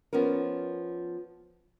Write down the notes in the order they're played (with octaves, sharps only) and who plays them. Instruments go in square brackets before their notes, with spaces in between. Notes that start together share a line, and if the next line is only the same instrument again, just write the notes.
[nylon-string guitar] F3 B3 C#4 A#4